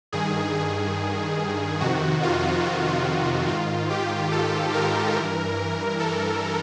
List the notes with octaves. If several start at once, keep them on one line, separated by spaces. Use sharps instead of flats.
G2 D#3 G#4
G#4
F2 C3 D#3 F#4
F4
F#4
F4
G#2 D#3 F4
G4
A4
A#4
G2 E3
A4